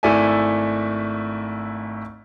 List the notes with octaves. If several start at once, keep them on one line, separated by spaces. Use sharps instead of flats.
G#1 A3 E4 D5 E5 G#5